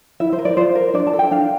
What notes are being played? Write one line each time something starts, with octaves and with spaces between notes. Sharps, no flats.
E4 E5
C5
A#4
D5
F4 C5
A#4
D4 D5
A5
A4
G5
D4 F5